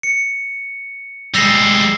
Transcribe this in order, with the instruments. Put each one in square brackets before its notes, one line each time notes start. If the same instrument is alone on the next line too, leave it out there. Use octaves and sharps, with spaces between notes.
[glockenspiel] C#7
[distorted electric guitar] G3 G#3 [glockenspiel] E6 A#6 C7